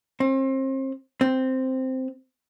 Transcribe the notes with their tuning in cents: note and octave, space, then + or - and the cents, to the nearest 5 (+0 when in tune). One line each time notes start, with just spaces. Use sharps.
C4 +35
C4 -5